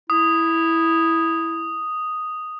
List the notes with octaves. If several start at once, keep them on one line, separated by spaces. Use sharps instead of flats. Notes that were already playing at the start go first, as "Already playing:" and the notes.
E4 D#6